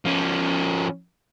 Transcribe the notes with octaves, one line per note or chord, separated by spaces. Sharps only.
F3 C#4